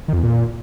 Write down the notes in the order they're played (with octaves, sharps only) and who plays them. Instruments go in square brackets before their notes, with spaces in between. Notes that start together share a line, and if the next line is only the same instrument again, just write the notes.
[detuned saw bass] D#3
F2
E2
A#2